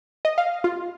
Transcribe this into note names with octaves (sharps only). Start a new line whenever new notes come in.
D#5
F5
F4